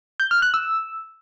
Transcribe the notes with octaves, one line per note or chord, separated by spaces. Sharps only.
G6
F6
F#6
E6